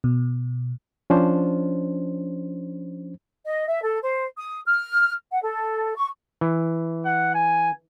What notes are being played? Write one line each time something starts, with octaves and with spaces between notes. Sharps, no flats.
B2
F3 C#4 D4 C5
D#5
E5
A4
C5
D#6
F6
F#5
A4
C#6
E3
F#5
G#5